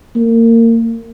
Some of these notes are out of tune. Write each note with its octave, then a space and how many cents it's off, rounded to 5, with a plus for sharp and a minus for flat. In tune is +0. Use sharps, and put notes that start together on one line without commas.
A#3 -30